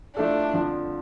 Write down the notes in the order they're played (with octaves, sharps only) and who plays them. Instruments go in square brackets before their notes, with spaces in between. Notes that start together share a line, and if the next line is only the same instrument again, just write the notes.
[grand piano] F3 A3 E4 A4 [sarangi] D4
[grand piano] F2 D3 F3